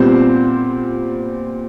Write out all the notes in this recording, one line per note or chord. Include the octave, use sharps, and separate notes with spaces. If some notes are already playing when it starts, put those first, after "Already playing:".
Already playing: A#2 G3 B3 C4 C5